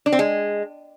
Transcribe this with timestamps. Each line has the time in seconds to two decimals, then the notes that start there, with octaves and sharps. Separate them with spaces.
0.06 D4
0.12 C4
0.19 G#3